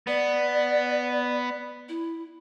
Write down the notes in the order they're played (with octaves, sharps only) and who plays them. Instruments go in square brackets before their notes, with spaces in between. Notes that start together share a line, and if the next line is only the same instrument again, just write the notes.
[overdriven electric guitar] B3 [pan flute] D5
[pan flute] E4